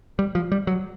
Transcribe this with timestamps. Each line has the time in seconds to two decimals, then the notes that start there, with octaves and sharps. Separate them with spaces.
0.19 G3
0.35 F3
0.52 G3
0.67 F#3